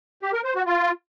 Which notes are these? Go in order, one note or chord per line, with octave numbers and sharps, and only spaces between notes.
G4
A#4
C5
F#4
F4